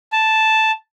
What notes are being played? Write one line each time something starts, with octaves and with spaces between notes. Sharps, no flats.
A5